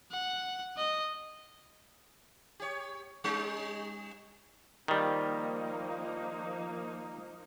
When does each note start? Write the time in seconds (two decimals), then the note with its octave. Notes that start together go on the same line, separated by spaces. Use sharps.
0.11 F#5
0.77 D#5
2.60 G4 C#5
3.24 G3 C#4 D#4
4.88 D#3 F3 G3 A#3 D#4